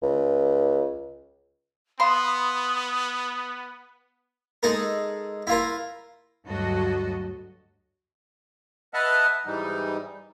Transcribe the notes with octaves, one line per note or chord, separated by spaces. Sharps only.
C#2
B3 F5 B5 C6 D#6
G#3 D#4 A4 A#4
E4 F4 A#4
D2 G2 F#3 F#4 A4 D#5
B4 D#5 E5 F#5 A5 F6
G#2 E3 G3 D#4